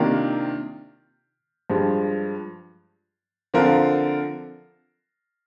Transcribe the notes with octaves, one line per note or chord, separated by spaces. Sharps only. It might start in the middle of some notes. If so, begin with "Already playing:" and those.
Already playing: C3 D#3 A#3 D4 F4
G2 F3 G#3
D3 F3 C4 F4 A#4